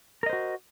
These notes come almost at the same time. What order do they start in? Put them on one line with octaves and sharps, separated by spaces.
A#4 D#5 C5 F#4